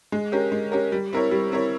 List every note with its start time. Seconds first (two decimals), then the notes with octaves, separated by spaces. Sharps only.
0.12 G#3
0.32 C#4 G4 A#4
0.52 G#3
0.72 C#4 G4 A#4
0.92 G3
1.13 C4 E4 A#4 C#5
1.31 G3
1.52 C4 E4 A#4 C#5